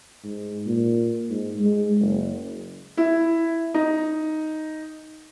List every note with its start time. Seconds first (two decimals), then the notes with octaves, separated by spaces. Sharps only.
0.23 G#2
0.66 A#2
1.29 G#2
1.59 G#3
1.99 F#1
2.97 E4
3.74 D#4